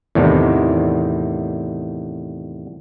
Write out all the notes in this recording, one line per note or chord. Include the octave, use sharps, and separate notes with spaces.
E2 A2 C3 D#3